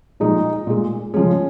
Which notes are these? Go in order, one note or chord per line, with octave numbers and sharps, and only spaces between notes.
A#2 F3 G#3 D#4
A#2 G#3
C#3 F3 G#3 C#4